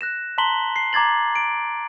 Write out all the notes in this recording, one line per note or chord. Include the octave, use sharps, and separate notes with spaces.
F#6 A#6 E7
A5 A#5 C6 B6 F#7 G7
C7
A#5 D6 G#6 A6 F#7
D7